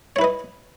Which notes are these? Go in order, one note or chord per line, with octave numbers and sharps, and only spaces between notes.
E4 B4 C#5 D#5